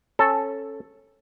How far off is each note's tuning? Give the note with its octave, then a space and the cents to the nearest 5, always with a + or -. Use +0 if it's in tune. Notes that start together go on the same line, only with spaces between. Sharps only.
C#4 -15 A4 +0